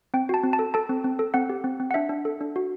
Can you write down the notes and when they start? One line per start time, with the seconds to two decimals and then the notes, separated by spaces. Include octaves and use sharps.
0.14 C4 G5
0.29 F#4 A5
0.44 C4
0.53 A5
0.59 A4
0.74 A4 A5
0.89 C4
1.04 C4
1.19 A4
1.34 C4 F#5
1.50 G4
1.64 C4
1.80 C4
1.91 F#5
1.94 D4 E5
2.09 D4
2.25 A4
2.41 D4
2.56 F#4